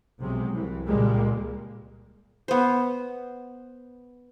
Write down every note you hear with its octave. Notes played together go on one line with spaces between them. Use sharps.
B1 C3 F#3 G#3
C2 E3
C#2 A#2 G3 G#3 A#3
B3 C5